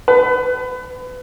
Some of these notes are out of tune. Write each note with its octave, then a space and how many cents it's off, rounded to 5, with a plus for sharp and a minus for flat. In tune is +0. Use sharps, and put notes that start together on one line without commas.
B4 +30